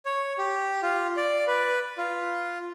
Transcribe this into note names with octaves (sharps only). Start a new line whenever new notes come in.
C#5
G4
F4
D5
B4
F4